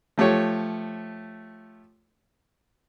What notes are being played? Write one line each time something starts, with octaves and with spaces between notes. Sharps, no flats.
F3 A3 G4 C#5